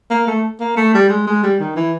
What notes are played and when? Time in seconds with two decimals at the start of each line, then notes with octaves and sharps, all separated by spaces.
0.10 A#3
0.27 A3
0.60 A#3
0.77 A3
0.94 G3
1.09 G#3
1.27 G#3
1.43 G3
1.60 D#3
1.76 E3